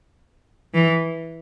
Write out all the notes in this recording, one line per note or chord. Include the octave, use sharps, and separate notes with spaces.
E3